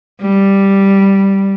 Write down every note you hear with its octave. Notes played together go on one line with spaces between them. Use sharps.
G3